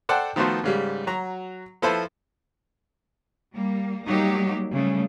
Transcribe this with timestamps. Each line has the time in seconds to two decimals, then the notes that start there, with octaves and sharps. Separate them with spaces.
0.09 A4 C5 D5 F#5 G5 A5
0.36 D#3 F3 A3 B3 F#4 C5
0.64 G#2 C#3 G3
1.07 F#3 F#4 A#5
1.82 F3 E4 A4 B4 C5
3.53 G3 A#3
4.07 F#3 G3 A#3 D#4 G4
4.72 C#3 G3 A3